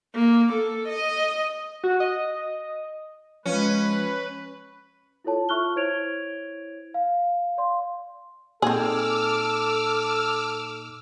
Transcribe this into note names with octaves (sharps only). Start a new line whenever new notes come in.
A#3
A4
D#5
F#4
D#5
F3 G#3 C#4 B4
E4 F4 A4 C#5 A5
F4 E5 C#6 F6 F#6 G7
E4 C5 C#5 G#6 D7 F7
F5
D5 F5 C6
A#2 C4 D#4 G#4 A4 D6 E6 F6